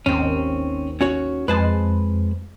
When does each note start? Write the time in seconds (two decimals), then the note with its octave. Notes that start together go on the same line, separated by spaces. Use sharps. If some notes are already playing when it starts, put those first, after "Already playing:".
0.06 G#1 D#2 C4 C#4
1.01 C#4 F#4 C#5
1.48 F2 G#3 B4 C5 A5